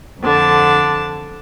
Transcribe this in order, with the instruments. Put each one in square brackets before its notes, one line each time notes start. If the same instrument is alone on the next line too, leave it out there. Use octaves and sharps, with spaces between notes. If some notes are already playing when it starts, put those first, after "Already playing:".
[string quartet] F2 D3 A5